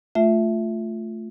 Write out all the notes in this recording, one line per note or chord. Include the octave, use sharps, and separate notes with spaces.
A3 F4 E5